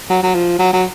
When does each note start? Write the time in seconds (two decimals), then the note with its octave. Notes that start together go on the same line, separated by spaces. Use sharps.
0.10 F#3
0.23 F#3
0.35 F3
0.59 F#3
0.73 F#3